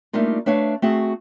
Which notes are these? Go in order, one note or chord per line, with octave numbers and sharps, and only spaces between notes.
G3 A3 A#3 D4 D#4 F4
A3 D4 B4 C#5 E5 F5
A3 C4 F#4 G#4